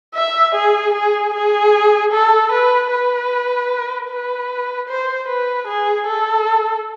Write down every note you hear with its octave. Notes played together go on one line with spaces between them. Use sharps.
E5
G#4
G#4
G#4
A4
B4
B4
B4
C5
B4
G#4
A4